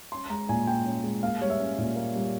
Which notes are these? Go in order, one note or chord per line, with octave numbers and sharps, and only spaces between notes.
C#4 C6
G#3 A#5
A#2 G#5
A#2 G5
C#4
G#3
A#3 F5
G3 C#5
E5
C#4
A#2
A#3
G3